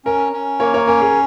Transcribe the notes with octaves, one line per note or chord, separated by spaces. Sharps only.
C#4 A#4
C#4
A#3 A#4 C#5
A#4 C#5
C#4 A#4
G#4